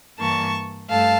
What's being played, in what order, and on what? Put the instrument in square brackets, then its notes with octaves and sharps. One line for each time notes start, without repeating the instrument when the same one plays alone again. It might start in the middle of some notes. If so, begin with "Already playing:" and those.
[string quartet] G2 E3 A#3 A5 C#6
G2 A3 F5 A5